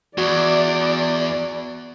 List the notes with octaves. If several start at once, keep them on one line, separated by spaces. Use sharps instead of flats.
E2 F#4 D5